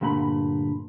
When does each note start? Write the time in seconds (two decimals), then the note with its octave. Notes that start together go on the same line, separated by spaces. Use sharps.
0.01 D2 G2 A#2 D3 B5